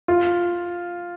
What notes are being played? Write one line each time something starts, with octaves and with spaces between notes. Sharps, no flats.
F4